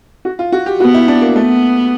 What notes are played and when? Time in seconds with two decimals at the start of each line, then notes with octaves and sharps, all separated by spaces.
0.25 F#4
0.39 F4
0.52 F#4
0.66 G4
0.80 B3 F#4
0.94 E4
1.08 D4
1.22 A#3
1.36 A3 B3